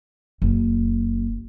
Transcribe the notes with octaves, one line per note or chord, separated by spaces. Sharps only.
F#1